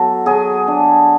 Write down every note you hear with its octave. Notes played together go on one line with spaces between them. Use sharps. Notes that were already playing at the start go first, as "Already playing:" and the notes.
Already playing: F#3 B3 A4
F#3 G#4
D4